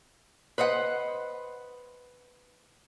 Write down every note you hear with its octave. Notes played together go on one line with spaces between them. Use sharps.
B4 C5 D#5 F#5